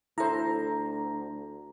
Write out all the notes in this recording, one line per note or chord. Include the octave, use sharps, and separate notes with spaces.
D2 E4 A4 C5 A#5